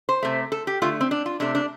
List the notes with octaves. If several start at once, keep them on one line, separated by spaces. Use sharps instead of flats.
C5
C3 A3
A4
G4
D3 A3 F4
C4
D4
F4
C3 A3 D4
D4